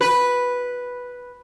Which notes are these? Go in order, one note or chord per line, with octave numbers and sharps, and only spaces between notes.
B4